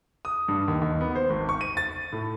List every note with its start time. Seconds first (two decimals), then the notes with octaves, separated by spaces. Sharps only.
0.25 D#6
0.48 G2
0.68 D#2
0.81 D#2
1.01 B3
1.15 C5
1.30 G#1
1.49 C#6
1.61 D#7
1.77 A6
2.12 A2